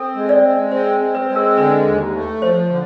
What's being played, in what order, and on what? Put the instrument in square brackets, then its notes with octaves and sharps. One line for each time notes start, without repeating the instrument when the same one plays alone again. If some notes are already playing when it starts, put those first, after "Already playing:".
Already playing: [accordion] C4 [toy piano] A4
[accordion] G#3
[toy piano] D5
[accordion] G#3
[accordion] C4 [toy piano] C5
[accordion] C4
[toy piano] B4
[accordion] G#3
[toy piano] A#4
[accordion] D3 [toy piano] B4
[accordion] D#2
A3
[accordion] F3 [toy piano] C5
[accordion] D3